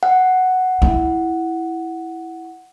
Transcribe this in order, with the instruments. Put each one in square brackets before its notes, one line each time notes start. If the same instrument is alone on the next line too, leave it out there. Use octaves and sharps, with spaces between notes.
[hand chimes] F#5
[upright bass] E4